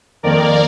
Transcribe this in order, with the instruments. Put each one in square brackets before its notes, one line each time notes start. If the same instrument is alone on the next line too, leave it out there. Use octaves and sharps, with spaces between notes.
[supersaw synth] F2 D#3 A#3 A#4 D5